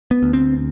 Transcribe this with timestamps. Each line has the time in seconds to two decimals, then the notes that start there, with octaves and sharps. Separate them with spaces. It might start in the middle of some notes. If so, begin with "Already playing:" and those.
0.11 B3
0.23 D2
0.33 C4